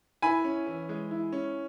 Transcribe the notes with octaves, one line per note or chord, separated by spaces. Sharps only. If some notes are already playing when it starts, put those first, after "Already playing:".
E4 G#5 B5
C#4
E3
G#3
E4
C#4